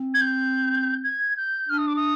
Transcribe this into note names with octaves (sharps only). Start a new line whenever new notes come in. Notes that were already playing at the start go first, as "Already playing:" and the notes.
Already playing: C4
G#6
G6
G#6
G6
D4 F6
D#6
D6
D#6